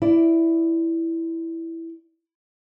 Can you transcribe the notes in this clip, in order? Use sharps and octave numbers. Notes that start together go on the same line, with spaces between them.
E4 D5